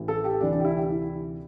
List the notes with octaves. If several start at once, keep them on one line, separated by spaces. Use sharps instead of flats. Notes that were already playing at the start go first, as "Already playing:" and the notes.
Already playing: A1 A2 E3
A4
G4
D2 C3 E3 D4
D4
G4
E4
G4
E4